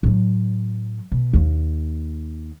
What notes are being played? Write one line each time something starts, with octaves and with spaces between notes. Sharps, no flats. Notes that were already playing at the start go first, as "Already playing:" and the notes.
A2 F#3
B2
D#2 A#3